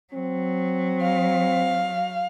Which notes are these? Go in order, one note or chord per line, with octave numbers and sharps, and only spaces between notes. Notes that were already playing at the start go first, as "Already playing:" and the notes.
F#3 C4
F5